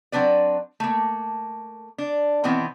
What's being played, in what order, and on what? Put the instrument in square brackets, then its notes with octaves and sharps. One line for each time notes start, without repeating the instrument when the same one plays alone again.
[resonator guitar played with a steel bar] F#3 C4 D4 B4 D5
A3 A#3
D4
B2 D#3 E3 B3 C4